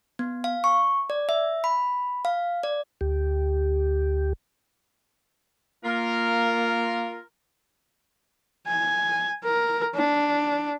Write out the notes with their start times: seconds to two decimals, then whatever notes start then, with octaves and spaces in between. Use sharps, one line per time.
0.19 B3
0.44 F5
0.64 C#6
1.10 D5
1.29 E5
1.64 B5
2.25 F5
2.63 D5
3.01 D2 G4
5.85 A#3 F4 A#4
8.67 G#5
9.45 A#4
9.95 D4